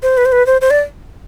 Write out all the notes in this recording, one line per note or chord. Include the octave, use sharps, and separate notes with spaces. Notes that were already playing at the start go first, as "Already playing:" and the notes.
C5
B4
C5
B4
C5
C5
D5